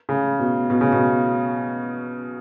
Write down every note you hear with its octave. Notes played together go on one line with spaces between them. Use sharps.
C#3
B2
B2
C#3
B2